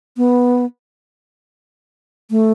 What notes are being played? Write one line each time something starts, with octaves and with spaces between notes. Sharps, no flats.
B3
A3